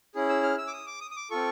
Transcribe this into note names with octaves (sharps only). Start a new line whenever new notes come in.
C#4 E4 G#4
E6
F6
E6
D6
D#6
D6
D#6
D#6
D6
C4 F4 A4 C#6